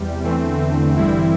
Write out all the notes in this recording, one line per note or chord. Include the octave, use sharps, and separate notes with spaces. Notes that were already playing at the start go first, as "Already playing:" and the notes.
Already playing: E2 C3 G3
E2 D3 E3 A3 C4
A1 G2 E3 G3 C4 E4